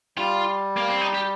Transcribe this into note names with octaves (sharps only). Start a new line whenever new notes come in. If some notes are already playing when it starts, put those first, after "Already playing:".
G3 F4
A#3
C4
D#4
G4